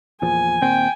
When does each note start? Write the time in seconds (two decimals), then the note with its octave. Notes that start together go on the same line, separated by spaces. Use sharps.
0.22 E2 A#2 F3 G#5
0.61 D#2 A#2 C4 G5